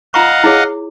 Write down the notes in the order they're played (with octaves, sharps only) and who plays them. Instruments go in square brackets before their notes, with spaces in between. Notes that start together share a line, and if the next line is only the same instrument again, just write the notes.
[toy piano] F4 A#5 C#6 [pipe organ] D#5 F5 F#5
[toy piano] E4 G#4 C#5